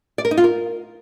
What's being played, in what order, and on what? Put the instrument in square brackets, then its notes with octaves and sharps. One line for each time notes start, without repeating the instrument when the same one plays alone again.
[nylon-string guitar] D5
A#4
D#4
F4
A#4